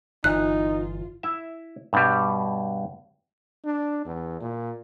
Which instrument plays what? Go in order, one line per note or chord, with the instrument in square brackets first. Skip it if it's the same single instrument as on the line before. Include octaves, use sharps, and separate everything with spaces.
[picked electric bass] G1 E3 [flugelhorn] D#4 [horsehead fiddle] F4 [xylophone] F#6
[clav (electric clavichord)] E4 E5
G2 B2 G3
[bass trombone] D4
E2
A#2